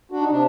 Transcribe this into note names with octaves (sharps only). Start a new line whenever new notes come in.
D4 F#4
D#4
C3 D4